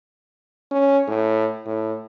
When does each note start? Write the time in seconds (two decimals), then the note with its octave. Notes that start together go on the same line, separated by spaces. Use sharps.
0.71 C#4
1.08 A2
1.66 A2